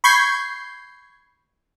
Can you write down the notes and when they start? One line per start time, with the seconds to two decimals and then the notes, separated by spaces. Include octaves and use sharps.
0.04 B5 C#6 G6 G#6 C7